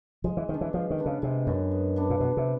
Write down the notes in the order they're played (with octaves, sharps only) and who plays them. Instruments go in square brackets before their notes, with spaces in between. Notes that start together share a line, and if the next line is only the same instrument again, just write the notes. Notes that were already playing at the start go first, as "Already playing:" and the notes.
[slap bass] F3 [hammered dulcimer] G#3
[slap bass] E3
[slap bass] D#3 [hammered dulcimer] B3
[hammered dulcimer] D4
[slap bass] E3
[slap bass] F3 [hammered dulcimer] G#3
[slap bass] D#3
[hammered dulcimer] B3 D4
[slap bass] C#3
[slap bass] C3 [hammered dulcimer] G#3
[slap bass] F#2 [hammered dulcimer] B3 D4
[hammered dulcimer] G#3
B3 D4
[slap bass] A#2
[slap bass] B2 [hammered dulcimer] F#3
[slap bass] C3